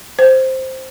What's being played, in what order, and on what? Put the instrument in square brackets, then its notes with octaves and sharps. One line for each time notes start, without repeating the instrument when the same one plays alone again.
[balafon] C5